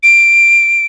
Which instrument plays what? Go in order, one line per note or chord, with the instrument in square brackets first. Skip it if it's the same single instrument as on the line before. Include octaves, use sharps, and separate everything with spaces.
[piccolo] D7